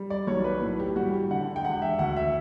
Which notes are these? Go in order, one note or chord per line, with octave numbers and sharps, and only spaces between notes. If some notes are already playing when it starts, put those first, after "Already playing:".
Already playing: G3
D5
B1 C#5
B4
A2
G4
G3 F#4
G4
D3 F#5
G5
E1 F#5
E5
D2 F#5
E5